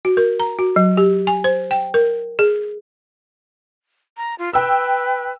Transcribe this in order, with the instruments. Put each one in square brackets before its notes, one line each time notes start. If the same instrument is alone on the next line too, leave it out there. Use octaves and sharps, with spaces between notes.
[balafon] F#4
A#4
A#5
F#4
F#3
G4
G#5
C5
G5
A#4
G#4
[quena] A#5
F4
[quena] B4 [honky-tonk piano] G5 E6